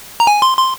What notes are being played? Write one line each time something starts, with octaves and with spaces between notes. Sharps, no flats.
A#5
G#5
C6
C6